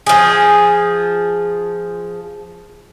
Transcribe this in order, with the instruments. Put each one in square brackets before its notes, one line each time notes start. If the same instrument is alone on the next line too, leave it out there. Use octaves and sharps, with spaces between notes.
[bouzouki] F3 G#4